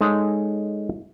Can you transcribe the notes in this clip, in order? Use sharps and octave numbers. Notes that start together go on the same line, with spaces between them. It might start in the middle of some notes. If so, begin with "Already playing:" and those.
G#3 D#4 A4 C#5